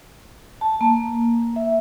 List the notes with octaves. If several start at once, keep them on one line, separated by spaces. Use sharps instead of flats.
A5
A#3
E5